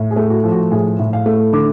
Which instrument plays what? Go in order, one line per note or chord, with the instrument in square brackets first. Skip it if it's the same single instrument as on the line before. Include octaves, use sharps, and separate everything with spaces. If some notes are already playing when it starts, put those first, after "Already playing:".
Already playing: [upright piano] A2
G#4
A3
F#4
F3
F#4
A2 G#4
A2
F5
A3
D3 D6